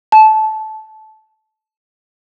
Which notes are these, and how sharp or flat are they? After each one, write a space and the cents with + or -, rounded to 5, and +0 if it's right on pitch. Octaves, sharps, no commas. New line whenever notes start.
A5 -15